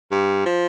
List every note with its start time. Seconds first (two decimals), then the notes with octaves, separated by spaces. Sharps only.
0.11 G2
0.46 F3